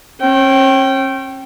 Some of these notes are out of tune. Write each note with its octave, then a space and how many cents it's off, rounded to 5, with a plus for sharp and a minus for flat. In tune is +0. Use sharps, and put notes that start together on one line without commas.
C#4 -40 G5 -15